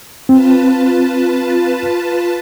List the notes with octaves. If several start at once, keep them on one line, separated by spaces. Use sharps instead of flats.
C4 F4 B4 A5